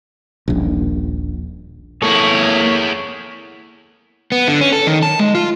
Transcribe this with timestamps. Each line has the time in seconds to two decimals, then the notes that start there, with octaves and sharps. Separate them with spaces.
0.48 D#1 A#1
2.03 A#3 E4 G#4 A4 C#5
4.32 B3
4.48 D3
4.61 C#4
4.73 A4
4.87 D#3
5.03 A5
5.19 G#3
5.35 F4